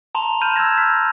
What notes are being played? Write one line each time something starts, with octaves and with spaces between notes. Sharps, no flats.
A5 A#5 C6 F7
B5 F6 G6 D#7 E7
E6 F#6 G#6 A#6
F6 B6